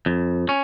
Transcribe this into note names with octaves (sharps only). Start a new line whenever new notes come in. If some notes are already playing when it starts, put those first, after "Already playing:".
F2
C#4